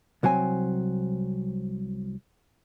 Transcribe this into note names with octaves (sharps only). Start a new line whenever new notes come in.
C2 F#3 C4 G#5